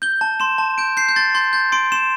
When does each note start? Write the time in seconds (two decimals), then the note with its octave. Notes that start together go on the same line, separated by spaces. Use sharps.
0.02 G6 G7
0.21 A5
0.40 C6 E7
0.58 A5
0.78 G6 D7
0.97 G6 C7
1.09 G6
1.16 C6 A6
1.35 C6 G6
1.53 G6 A6
1.72 C6 D7
1.92 C6 E7